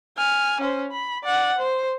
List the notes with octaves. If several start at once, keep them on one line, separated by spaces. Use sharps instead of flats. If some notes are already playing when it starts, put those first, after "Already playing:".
G#5 F6
C#4 C5
B5
D5 F#5
C5